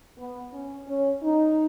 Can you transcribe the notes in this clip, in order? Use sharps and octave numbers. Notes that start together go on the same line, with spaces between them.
B3
C#4
C#4
D#4